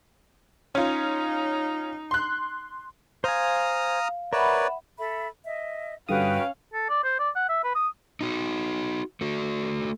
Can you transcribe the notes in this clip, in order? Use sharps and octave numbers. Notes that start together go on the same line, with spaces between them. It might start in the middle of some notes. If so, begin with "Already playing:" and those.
C#4 D#4 F4
C6 F#6
C5 F5 G#5 A#5 D#6 F6
A#4 B4 C#5 D5 E5 F#5 B5
A4 E5 B5
D#5 E5
G2 D3 C#4 F#4 B4 F5 G5 D#6
A4
D5
C5
D5
F#5
E5
B4
D#6
D#4 F#4
A3 F#4